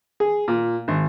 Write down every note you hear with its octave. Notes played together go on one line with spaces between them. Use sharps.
G#4
A#2
G#1